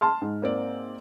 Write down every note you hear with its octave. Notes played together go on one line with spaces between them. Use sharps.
A5 C6 F6
G#2
A#3 C4 D5